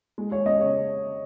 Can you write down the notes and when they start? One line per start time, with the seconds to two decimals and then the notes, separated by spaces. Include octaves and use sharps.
0.18 G#3
0.31 G#3 C#5
0.46 C#4 D#5
0.61 C#3 C#5